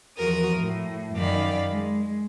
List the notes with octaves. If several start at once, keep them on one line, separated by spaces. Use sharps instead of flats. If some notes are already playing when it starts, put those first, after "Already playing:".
E2 F3 F#4 A#4 D#6
A2
F#2 D#3 D5 F5 B5
G#3